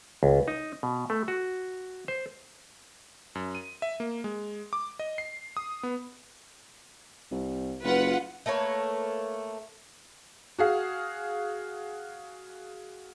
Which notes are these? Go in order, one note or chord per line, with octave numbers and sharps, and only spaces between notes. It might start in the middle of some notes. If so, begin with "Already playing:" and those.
C#2
D#4
B2
A3
F#4
C5
F#2
D#7
E5
A#3
G#3
D6
D#5
C7
D#6
B3
C2
F#1 F4 B4 F#5
A3 A#3 B4 C#5
F#4 G#4 F5